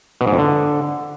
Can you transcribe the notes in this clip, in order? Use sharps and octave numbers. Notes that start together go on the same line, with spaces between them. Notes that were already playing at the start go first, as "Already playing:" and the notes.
B2
G#2
F2
D3